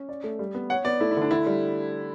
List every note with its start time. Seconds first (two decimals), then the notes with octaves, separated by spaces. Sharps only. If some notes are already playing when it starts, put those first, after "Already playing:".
Already playing: C#4
0.09 D5
0.24 A3
0.39 G3
0.55 B3
0.70 C#5 F#5
0.85 B3 D5
1.01 A3 E4
1.11 E4
1.16 D3
1.22 D4
1.31 D3 E4
1.47 G3